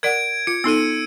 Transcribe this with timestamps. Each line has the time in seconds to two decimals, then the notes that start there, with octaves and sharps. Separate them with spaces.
0.03 A#4 D5 F#5 G#6 D7
0.47 F4 C#7
0.64 B3 D#4 A4 E6 D#7